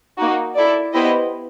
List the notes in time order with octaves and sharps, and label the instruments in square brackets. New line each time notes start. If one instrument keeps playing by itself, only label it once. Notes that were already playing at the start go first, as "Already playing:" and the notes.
[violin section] A#3 D#4 F#4
E4 A4 D5
B3 E4 G4 C5 D#5